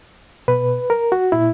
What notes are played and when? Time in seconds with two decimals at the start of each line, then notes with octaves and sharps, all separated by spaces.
0.48 B2 B4
0.90 A#4
1.12 F#4
1.32 A#2 E4